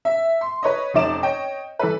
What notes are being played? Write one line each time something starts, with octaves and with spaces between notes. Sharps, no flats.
E5
C6
B4 C#5 D#5
F1 C#4 D#4 D5 D6 E7
C#5 D#5 G5
E3 A4 B4